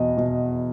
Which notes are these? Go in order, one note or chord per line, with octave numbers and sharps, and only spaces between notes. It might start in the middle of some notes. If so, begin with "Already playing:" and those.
Already playing: E2 B2 D#5
B2